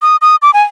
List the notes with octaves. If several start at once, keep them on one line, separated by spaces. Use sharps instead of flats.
D#6
D#6
D6
G#5